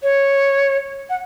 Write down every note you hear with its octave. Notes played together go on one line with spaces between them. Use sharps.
C#5
F#5